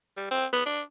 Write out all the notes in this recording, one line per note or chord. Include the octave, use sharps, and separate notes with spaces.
G3
C4
B3
D4